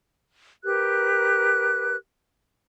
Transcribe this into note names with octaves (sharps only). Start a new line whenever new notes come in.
G4 A#4 B4 F#6